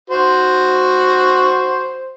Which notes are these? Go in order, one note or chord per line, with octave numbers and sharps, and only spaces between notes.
F#4 C5